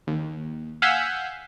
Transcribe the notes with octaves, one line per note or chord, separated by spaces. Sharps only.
D#2
F5 F#5 G#5 E6 G6 B6